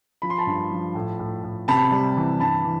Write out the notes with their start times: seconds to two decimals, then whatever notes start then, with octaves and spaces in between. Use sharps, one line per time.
0.22 F3 B5
0.30 C6
0.38 A5 B5
0.47 G2
0.71 F3
0.95 A2
1.19 A2
1.43 A2
1.68 C3 A5 B5
1.92 G3
2.17 E3
2.40 G2 A5 B5
2.65 E3